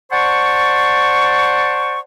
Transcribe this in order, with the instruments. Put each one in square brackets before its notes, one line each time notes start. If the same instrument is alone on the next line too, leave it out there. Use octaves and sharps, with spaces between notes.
[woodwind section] C5 D5 F#5 A5 C6 C#6